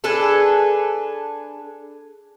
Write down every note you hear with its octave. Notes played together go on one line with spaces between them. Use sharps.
D4 G#4 A4 B4